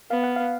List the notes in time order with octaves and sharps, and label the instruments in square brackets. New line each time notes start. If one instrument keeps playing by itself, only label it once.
[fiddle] B3 [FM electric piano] F5
[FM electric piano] F#5
F5